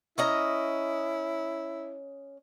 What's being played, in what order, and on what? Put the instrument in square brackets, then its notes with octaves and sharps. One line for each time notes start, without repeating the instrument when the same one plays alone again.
[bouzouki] C#4 D#5 A#5 [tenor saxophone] E4